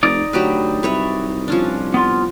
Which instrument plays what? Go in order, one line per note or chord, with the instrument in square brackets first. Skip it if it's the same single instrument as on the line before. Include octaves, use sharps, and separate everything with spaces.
[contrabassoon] F1 [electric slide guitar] D#4 D5
[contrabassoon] D2 [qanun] F#3 G4 B4
[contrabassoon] C2 [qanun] B4 C#5 E5
[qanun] F3 C#4 D4
[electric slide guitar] B3 F4